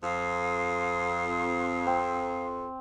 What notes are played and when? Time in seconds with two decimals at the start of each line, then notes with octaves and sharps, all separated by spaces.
0.03 F2 F5 C6 D#6
1.87 C4